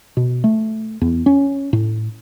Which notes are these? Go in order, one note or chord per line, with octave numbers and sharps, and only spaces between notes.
B2
A3
E2
C#4
A2